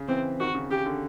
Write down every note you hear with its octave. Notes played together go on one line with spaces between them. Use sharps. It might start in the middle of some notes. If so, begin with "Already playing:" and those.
Already playing: C#3
E3 C4
D#3 F#4
C#3
C#3 G4
D3